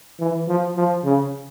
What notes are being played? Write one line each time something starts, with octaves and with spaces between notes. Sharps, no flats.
E3
F3
F3
C#3